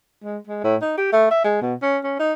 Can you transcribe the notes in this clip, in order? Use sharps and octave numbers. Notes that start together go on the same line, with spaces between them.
G#3
G#3
A2
D#4
G4
A3
E5
G#3
B2
C#4
C#4
D#4